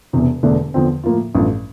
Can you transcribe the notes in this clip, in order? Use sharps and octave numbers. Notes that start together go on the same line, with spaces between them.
E1 E2 C3
E1 E2 D3 A3 D4
E2 D3 F3 C4
A2 F3 A#3 F4
A1 G2 F3 A3